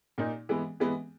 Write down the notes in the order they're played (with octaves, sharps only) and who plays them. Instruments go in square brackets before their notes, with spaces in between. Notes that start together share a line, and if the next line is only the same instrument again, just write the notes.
[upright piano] A#2 A#3 D#4
E3 G#3 B3
E3 G#3 B3